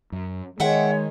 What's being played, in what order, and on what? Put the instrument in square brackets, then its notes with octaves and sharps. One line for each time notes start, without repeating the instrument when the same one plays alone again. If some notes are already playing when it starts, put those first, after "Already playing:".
[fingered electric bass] F#2
[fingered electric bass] D#3 [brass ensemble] G#3 [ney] C#5 [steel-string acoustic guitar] E5 F#5 G5